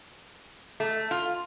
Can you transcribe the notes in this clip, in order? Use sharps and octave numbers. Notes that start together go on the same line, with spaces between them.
A3
F4